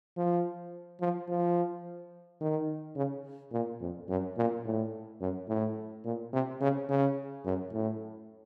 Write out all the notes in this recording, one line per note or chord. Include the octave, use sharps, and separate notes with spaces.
F3
F3
F3
D#3
C#3
A#2
F2
F#2
A#2
A2
F#2
A2
A#2
C3
C#3
C#3
F#2
A2